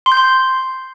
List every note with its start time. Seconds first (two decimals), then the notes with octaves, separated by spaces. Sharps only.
0.06 C6
0.12 G6
0.17 C6